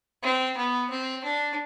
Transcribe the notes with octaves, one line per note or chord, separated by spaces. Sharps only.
C4
B3
C4
D4